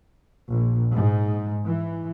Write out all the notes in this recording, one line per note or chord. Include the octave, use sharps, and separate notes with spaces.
A#1
G#2
E3